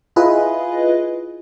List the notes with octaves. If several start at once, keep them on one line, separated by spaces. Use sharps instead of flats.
E4 F4 G#4 B4 D#5